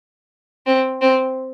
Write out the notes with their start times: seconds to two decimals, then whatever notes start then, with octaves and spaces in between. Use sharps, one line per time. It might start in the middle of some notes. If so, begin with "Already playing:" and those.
0.66 C4
1.01 C4